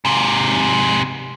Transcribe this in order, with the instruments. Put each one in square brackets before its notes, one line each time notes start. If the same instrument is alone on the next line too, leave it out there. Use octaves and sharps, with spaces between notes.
[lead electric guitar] G#2 C3